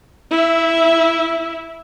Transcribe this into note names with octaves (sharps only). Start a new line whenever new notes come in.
E4 E5